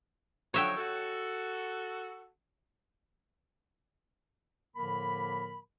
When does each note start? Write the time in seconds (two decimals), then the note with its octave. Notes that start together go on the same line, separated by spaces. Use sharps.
0.54 D3 F3 F#3 C#5 E5 G5
0.77 F#4 A4
4.76 A2 D3 F3 A#3 A#4 B5